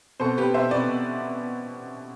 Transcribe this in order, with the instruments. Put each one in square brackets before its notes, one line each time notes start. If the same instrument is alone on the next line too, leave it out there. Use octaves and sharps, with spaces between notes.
[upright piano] B2 A4 C5
B2 G4 B4
B2 C5 E5
B2 B4 D5
B2